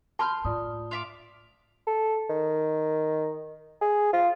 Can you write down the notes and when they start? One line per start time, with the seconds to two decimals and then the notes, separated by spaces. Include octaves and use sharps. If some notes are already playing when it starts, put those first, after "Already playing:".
0.19 A5 B5 C6 F6 G6
0.45 A2 F4 D5 D#6
0.91 F4 E5 D6 F7
1.87 A4
2.30 D#3
3.81 G#4
4.13 F4